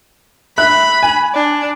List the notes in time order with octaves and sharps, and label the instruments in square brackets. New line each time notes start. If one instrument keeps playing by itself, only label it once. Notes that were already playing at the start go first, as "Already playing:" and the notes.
[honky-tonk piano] E5 F#6 [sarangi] B5
[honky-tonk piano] G#5
[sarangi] D4